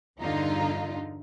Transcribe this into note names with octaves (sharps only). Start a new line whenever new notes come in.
E2 G2 D3 D#4 F4